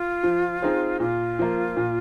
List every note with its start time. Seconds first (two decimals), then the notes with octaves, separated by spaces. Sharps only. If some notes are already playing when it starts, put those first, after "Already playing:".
Already playing: F4
0.23 F3
0.62 C4 D#4 G#4 C5
1.00 A#2 F4
1.39 F3 A#3
1.76 A#2